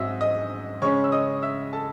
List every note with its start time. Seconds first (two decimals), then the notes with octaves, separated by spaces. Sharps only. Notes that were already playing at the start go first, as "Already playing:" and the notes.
Already playing: G#2 F#3 C4 D#5 E5 D#6 E6
0.21 D#5 D#6
0.82 C#3 G#3 C#4 C#5 C#6
1.04 E6
1.12 D#5 D#6
1.43 E5 E6
1.73 A4 A5